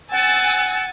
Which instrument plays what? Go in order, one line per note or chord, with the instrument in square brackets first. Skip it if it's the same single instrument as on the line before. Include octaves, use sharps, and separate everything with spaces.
[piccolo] F#5 [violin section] G#5 E6 A6